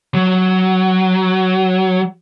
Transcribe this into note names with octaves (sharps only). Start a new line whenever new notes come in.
F#3